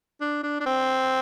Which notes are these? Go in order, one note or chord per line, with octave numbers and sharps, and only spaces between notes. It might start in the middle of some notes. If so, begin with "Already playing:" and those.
D4
D4
D4
C4